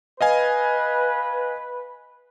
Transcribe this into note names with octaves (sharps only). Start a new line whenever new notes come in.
B4 D#5 F5 G#5